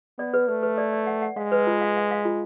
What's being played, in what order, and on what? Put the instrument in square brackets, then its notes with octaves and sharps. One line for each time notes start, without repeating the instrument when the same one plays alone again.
[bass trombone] B3 [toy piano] D5
[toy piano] B4
[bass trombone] A3 [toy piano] B4
[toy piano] B4
D5
D5
F#5
F#5
[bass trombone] G#3 [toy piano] F5
[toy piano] B4
F4
F5
F5
F5
F4